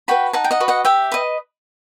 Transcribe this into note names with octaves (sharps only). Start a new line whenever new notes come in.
F#4 B4 G5 B5
D#4 F#5 A5
G5
D#5 F#5
F#4 B4
D#5 F#5
G4 E5 G5
B4 D#5